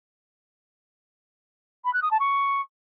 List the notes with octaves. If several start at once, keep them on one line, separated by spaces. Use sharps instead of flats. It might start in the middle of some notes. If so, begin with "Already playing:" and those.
B5
F#6
D#6
A5
C#6